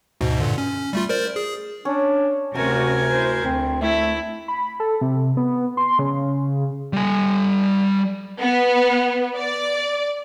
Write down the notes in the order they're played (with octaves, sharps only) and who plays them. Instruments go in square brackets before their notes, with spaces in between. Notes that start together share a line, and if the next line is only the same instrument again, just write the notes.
[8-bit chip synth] D2 G#2 B2
G2 A#2 D3
C#4
G3 A3 F4
A#4 C5 D5
G#4
[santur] C#4 [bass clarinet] D4
[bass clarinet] D2 [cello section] C3 C#4 F#4 [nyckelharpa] A#4 G#5 [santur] A5
[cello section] E4 C5
[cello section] D2 [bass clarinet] C4
[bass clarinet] A3 [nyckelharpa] E4
[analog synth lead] B5
A4
C3
B3
C6
C#3
[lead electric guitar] G3 G#5
[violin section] B3
D5